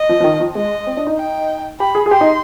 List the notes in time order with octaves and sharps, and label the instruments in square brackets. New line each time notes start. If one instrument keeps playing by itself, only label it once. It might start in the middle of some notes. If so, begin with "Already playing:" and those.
Already playing: [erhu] D#5
[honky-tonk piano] F3
F3
D#3
F3
[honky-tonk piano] G#3 [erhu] D#5
[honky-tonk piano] C4
D4
D#4
[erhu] G5
[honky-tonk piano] G4 [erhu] B5
[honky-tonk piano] G#4
G#4
[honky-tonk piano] G4 [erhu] C6
[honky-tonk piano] D#4